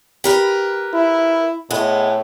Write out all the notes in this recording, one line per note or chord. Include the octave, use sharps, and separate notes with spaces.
G4 A#4 B4
E4
A2 G#3 B3